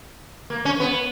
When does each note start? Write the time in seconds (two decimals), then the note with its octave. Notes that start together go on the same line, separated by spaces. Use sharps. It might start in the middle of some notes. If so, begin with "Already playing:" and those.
0.50 A#3
0.65 C#4
0.80 B3